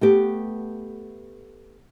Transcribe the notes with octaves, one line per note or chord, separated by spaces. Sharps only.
A3 B3 G4